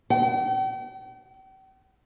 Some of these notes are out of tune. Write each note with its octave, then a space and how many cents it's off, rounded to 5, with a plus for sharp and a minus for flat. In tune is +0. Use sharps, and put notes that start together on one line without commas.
G5 -40